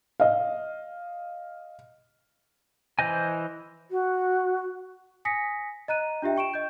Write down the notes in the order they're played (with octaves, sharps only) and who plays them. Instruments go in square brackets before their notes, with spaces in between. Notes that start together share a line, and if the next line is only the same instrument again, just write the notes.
[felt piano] D#5 F5
[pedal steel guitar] E3 C5 D#5 G#5
[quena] F#4
[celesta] G#5 D#6 A#6 B6 C#7
D#5 A#5 F#6 D#7
D4 F4 G4 E5 G5
G5 C#6 D7 E7
D#5 G6